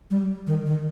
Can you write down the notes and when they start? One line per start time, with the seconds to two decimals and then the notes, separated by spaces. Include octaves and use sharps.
0.11 G3
0.47 D#3
0.66 D#3